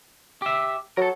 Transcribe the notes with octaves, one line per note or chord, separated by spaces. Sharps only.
G4 E5
F#3 A4 A#4